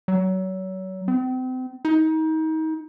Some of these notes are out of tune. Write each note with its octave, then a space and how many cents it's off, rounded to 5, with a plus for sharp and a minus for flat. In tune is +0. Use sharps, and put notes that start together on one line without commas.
F#3 +30
C4 -35
D#4 +30